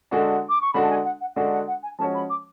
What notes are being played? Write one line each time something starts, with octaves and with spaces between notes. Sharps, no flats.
D3 G#3 D4 F#4
D6
C#6
D3 G#3 D4 F#4 B5
A5
G#5
F#5
F#5
D3 G#3 D4 F#4 F#5
F#5
F#5
G#5
F3 G#3 C#4 F#4 C#5 A5
B5
D6